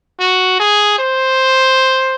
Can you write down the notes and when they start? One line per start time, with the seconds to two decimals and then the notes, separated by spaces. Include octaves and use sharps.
0.20 F#4
0.60 G#4
0.98 C5